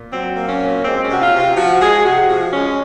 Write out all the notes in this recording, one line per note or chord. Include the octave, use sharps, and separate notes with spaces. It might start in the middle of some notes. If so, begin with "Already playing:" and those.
Already playing: A#2
F#3 C4
A#3
C#4
A#2
G#3 C4
C#4
C3 F#4
F4
C3
F4
F3 F#4
G#3 G#4
C3 F#4
F3
G#3 C#4